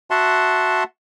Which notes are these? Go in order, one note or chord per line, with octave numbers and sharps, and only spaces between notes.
F#4 E5 F#5 A5 C6